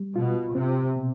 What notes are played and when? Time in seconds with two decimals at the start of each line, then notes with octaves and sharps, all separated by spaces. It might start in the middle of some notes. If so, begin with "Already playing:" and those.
Already playing: G3
0.15 B2 F4
0.55 C3 C4
0.96 B2